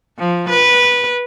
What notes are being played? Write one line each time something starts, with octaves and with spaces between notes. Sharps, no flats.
F3
B4